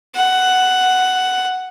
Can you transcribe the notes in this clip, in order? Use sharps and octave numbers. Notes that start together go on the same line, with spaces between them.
F#5